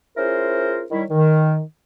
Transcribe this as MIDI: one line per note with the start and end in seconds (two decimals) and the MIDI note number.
0.17 0.84 61
0.17 0.84 64
0.17 0.84 65
0.17 0.84 68
0.17 0.84 70
0.17 0.84 72
0.91 1.03 51
0.91 1.03 55
0.91 1.03 64
0.91 1.03 73
1.10 1.61 51